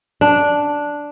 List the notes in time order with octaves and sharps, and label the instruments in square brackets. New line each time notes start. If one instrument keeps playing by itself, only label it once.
[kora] D4